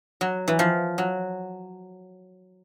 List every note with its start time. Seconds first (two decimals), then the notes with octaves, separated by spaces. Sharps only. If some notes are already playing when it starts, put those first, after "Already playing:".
0.21 F#3
0.48 E3
0.59 F3
0.98 F#3